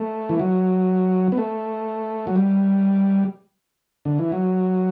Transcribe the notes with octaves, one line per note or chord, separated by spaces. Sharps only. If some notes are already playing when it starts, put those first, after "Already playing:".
Already playing: A3
E3
F#3
B3
A3
F#3
G3
D3
E3
F#3